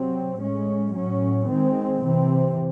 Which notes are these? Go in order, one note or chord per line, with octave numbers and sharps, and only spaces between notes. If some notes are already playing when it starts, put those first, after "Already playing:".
Already playing: C3 F#3 C4
A2 G#3 C#4
A2 F#3 C#4
D#3 G#3 C4
C3 E3 C4